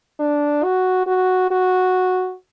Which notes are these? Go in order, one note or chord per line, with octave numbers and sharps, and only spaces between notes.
D4
F#4
F#4
F#4